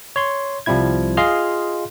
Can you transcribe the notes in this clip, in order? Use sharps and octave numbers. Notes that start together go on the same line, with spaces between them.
C#5 C6
C2 F3 G3 C4 E4 G#6
F4 G#4 D#5 F5 C6 F6